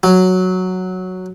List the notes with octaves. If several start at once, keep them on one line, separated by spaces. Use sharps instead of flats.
F#3